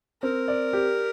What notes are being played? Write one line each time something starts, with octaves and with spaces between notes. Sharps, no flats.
C4 A#4
D5
G4